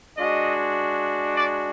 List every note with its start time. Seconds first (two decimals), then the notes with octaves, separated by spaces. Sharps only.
0.18 G#3 D4 F#4 D#5
1.35 D5